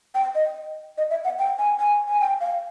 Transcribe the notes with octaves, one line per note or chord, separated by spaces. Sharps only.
G5
D#5
D#5
E5
F#5
G5
G#5
G#5
G#5
G5
F5